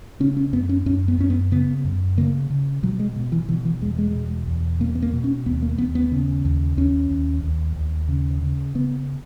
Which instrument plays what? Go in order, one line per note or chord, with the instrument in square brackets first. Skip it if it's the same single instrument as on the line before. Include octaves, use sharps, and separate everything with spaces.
[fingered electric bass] C#3 C#4
C#4
F#2 B3
C#4
F#2 C#4
B3
F#2 C#4
B3
C#3 B3
F#2
C#3 A#3
C#3
B2 F#3
G#3
B2
E3
B2 E3
E3
E2 G#3
G#3
B2
E2
B2 A#3
B3
A#3
B2
C#4
D#2 B3
A#3
D#2 B3
B3
C#3
D#2
D#2 C#4
D#2
D#2
D#2
C#3
C#3
C#3 B3